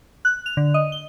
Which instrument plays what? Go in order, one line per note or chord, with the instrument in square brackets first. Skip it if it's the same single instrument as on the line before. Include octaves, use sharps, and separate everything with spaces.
[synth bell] F#6
F7
D3
D#5
G7